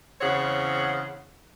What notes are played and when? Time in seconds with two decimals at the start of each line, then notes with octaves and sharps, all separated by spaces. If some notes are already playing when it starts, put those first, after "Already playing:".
0.21 E2 C#3 C4 C#5 F#5